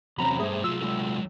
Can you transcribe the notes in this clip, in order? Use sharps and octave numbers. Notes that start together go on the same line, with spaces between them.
E2 C3 F#3 C4 C#4 A#5 B5
G2 B2 A3 G#4 C5
C2 F#3 F4 E6
G#3 F4 A4